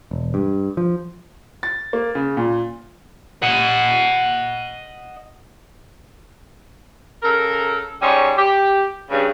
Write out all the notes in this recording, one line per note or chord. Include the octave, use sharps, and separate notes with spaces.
E1
G2
F3
A6
A#3
C#3
A#2
D#5 F#5
C#3 A4 A#4
G#2 G3 C#4 C#5 D#5
G4
G2 C#3